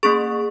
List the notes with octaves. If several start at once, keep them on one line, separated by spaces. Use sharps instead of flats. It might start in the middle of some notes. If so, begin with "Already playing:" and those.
A#3 C#4 G#4 C#6